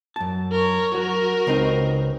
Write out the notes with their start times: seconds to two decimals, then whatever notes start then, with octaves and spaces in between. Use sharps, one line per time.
0.16 F#2 A5
0.52 A#4 C#5
0.94 F#3 F#4 A#4
1.47 C#2 C4 D#4